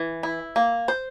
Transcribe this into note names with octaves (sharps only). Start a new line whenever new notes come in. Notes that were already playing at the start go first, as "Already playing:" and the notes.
Already playing: E3
E4
A#3
C5